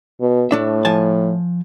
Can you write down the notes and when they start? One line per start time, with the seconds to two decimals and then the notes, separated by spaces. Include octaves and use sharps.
0.20 B2
0.51 A2 A3 D4 E5
0.85 F3 G#5 A5